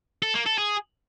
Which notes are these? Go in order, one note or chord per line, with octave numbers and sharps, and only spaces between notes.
A4
A#3
A4
G#4